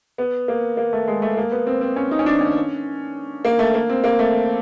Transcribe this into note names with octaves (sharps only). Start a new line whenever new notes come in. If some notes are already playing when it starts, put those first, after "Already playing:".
B3
A#3
A#3
A3
G#3
A3
A#3
B3
C4
C4
C#4
D#4
C#4
D4
C#4
A#3
A3
A#3
C4
A#3
A3